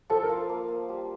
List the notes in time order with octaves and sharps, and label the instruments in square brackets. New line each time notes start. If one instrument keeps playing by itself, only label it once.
[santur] F3 [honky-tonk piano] A4
[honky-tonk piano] A#4
[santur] F4
A#3
A#3
G3